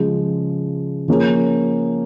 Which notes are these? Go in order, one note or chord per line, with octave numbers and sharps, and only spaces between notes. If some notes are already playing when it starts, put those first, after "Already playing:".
Already playing: C#3 F3 G#3
F3 A#3 C#4 G#4